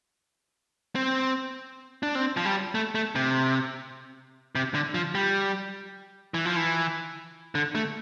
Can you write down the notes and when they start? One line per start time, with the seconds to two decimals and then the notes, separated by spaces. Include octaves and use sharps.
0.95 C4
2.03 D4
2.15 C4
2.37 F3
2.45 G3
2.75 A3
2.95 A3
3.15 C3
4.55 C3
4.74 D3
4.94 F3
5.15 G3
6.34 E3
6.45 F3
6.56 E3
7.55 D3
7.75 A3